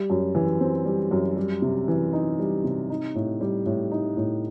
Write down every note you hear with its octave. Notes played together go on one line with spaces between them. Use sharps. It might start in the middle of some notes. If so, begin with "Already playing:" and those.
Already playing: G3
F#2
E3
C4
G3
F#2
G3
C3
E3
D#4
G3
C3
D#4
A2
G3
A2
D#4
A2